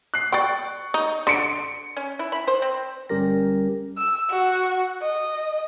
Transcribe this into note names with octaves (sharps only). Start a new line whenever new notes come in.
F#6 C7
D5 G5 C#6
D#4
D3 C6 C#7 D7
C#4
E4
B5
C5
C4
G1 G3 C#4 G4 A#4 A#6
E6
F#4
D#5